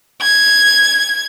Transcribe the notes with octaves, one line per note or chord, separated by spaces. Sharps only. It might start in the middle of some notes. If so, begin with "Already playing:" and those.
G#6